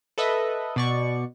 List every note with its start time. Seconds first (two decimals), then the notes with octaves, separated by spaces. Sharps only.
0.18 A4 B4 D#5 E5
0.76 B2 D5 C#6